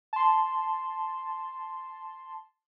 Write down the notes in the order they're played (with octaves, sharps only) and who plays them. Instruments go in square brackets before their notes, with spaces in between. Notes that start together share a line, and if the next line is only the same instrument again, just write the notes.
[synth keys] A5 C6